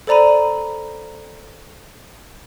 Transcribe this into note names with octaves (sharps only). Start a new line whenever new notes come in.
A4 C5 D5 A#5 B5 D#7